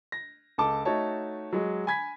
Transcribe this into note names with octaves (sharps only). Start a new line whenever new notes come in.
A#6
C#2 A4 A5 D6
A3 D#4 F#4 C#5 A5
F#3 G#3
G#5 B5 G#6 B6